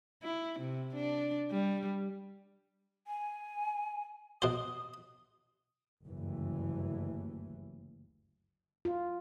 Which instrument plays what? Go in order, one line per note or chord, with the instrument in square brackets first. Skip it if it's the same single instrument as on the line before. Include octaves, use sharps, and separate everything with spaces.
[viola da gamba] E4
C3
D4
G3
[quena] G#5
[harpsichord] B2 C5 [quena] D#6
[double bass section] F#1 D2 G2 E3
[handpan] F4